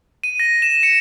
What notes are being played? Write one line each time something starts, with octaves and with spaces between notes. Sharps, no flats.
D#7
A#6
E7
C#7